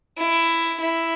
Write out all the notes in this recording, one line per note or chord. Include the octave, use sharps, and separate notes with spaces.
E4
E4